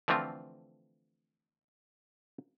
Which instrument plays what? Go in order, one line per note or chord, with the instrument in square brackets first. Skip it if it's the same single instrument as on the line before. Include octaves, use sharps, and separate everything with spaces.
[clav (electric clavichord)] D3 E3 F3 A3 C4 F4